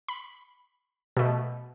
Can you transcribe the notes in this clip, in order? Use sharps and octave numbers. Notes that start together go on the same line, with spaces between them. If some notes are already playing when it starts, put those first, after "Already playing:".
B5
B2 A3